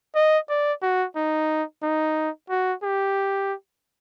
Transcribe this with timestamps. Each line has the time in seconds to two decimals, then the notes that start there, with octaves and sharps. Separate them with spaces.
0.15 D#5
0.49 D5
0.82 F#4
1.16 D#4
1.83 D#4
2.50 F#4
2.83 G4